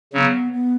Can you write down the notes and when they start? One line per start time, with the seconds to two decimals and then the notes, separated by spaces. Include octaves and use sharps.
0.13 C#3 F#3 B3 C#4
0.52 B3